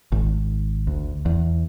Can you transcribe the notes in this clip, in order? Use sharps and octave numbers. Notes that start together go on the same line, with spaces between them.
G#1
D2
E2